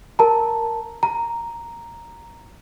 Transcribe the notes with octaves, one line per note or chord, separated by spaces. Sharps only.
A#4 A5 A#5
A#5